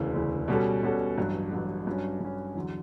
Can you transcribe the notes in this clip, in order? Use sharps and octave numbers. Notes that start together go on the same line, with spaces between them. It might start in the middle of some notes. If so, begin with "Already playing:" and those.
Already playing: E1 D2 C#3 E3
E1 D2 C#3 E3
B2 G3 C#4 F#4 A4
B2 G3 C#4 F#4 A4
A1 G2 F#3
A1 G2 F#3
G2 F#3 C#4
G2 F#3 C#4
E2 D3 F#3